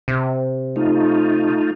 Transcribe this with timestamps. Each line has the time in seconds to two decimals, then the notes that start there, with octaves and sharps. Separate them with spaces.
0.08 C3
0.76 A3 D#4 F4